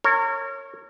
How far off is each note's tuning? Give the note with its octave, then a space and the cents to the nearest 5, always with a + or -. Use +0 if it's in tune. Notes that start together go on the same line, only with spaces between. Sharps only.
A#4 -35 C#5 -15